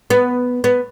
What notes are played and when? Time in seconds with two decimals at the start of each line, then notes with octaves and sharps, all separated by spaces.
0.10 B3
0.64 B3